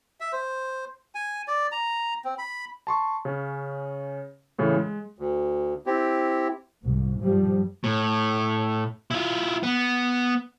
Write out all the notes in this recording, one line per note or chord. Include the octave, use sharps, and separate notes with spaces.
E5
C5
G#5
D5
A#5
C4
B5
A5 C6 C#6
C#3 C#4
A2 C#3 E3
G#3
D2
C4 E4 G4
C2 G#2
G2 F3 G3
A2
E4 F4
B3